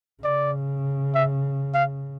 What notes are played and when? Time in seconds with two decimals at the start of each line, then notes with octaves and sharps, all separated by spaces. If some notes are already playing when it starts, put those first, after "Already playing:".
0.24 C#3 D5
1.15 E5
1.74 F5